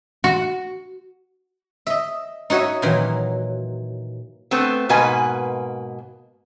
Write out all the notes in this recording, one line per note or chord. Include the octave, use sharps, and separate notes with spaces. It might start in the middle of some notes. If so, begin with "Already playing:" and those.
F#4
D#5 E5
D#4 F#4 C#5 D#5 E5
A#2 D#3 E3 F#3
A3 B3 C4
G#2 B2 A#3 B4 G#5